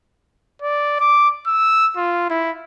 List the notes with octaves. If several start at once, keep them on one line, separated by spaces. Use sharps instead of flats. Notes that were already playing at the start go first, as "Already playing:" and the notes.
D5
D6
E6
F4
E4